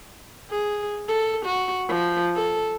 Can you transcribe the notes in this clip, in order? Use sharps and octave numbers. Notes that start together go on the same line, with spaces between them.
G#4
A4
F#4
F3
A4